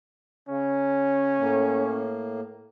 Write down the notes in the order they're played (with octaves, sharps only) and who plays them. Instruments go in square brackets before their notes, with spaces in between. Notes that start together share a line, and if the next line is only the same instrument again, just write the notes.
[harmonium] C#3 [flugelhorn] C#4
[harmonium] A2 A#3